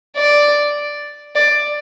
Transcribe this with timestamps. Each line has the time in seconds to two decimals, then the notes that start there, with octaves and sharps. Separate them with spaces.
0.17 D5
1.36 D5